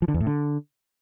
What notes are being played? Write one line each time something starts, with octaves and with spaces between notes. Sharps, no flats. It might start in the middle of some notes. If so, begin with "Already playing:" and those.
F3
D3
E2
A2
D3